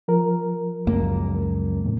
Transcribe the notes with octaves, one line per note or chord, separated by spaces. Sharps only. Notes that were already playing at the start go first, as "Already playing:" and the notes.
F3 A#4
C#2 F#2 A#3
E2 A2 C3